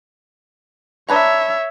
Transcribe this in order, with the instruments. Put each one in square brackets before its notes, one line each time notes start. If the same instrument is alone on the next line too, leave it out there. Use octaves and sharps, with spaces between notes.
[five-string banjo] D4 B4 A#5 [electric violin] C#5 E5